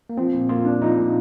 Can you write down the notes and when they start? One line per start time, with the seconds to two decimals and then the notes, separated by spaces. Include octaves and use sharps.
0.10 A#3
0.17 F3 C4
0.34 A#2
0.49 A#3 F4
0.65 D4
0.82 F3 D#4
0.98 A#2